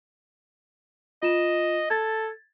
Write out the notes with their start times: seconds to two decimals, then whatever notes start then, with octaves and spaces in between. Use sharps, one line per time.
1.23 F4 D#5 E7
1.90 A4 G#6 A6